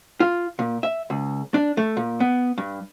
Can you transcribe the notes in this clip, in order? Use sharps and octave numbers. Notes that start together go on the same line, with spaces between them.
F4
A#2
E5
C#2
D4
A3
A#2
B3
G2